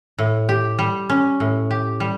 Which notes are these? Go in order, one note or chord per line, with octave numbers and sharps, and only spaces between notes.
A2
G4
G3
C#4
A2
G4
G3